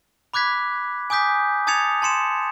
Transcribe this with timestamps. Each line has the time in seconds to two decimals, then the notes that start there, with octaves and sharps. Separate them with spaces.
0.34 B5 D6 F#6 G#6 B6
1.10 G#5 D6 D#6 G6 B6
1.67 A5 D#6 G#6 A6 C#7 F7
2.02 A5 C6 C#7 E7